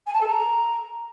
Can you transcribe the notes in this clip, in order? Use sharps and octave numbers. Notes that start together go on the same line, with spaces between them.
G#5
A5
A4
A#5